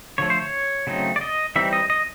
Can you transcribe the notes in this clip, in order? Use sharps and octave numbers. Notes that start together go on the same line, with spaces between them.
D3 F3 A3 C#5
C5
C#5
C#3 F#3 A3 C4 D#4
D5
D#5
E3 G3 C4 D#4 E5
D#5
D#5